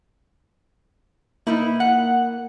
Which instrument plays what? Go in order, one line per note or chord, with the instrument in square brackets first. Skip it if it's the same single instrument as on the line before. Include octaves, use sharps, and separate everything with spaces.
[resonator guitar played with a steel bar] B2 D#4 E4 [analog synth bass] A#3
[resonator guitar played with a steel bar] F#5